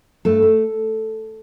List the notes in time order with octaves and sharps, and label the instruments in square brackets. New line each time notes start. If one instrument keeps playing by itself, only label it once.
[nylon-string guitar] G2 A3 A4
A3